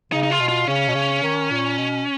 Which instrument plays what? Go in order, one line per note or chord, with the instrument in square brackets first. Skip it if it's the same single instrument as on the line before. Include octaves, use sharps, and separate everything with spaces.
[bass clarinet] C#3 [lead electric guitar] D#4
[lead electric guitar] D#4
F4
[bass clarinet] B2
[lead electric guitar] F4
[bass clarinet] C#3 [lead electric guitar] C#4
[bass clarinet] B2
C#3
D#3
A#2
B2